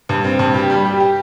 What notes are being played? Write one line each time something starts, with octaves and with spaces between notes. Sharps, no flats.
G2
C4
G2
G4
G3
G4
G4